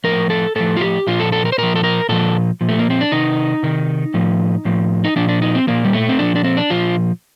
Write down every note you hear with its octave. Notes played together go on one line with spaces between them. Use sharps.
A2 F3 A#4
A4
A2 F3 A4
F4
G4
A#2 F3 F4
A4
A4
A#4
C5
A#2 F3 A#4
A4
A#4
A#2 F3 A4
A#2 F3
A3
A#3
C4
D4
C3 D#3 D#4
C3 D#3
A2 F3
A2 F3
D#4
A#2 F3 D4
D4
D#4
C4
A#2 F3 A#3
G3
A3
C4
A#2 F3 D4
D4
C4
D4
A#2 F3 F4